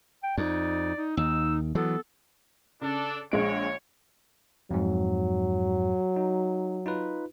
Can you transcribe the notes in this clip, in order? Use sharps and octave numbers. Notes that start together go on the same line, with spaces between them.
G5
F2 D#4 D5
D#4
D#2 D#4 E6
E3 F#3 B3 A4
C#3 D4 A4
A#1 G#3 C#5 D7
F2 G#2 F#3
D#4
D#4 F4 B4